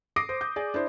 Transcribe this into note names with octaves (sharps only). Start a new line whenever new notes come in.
D6 D#6 A#6 C7 D7
C5
G6
G#4 D5
D4 E4 C5